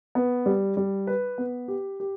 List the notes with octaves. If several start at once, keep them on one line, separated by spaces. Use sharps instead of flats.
B3
G3
G3
B4
B3
G4
G4